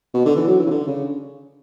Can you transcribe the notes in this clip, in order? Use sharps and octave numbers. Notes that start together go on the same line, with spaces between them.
B2
D3
E3
F#3
E3
C#3
D3
C#3